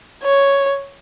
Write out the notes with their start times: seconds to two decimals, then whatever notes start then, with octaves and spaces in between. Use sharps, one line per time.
0.23 C#5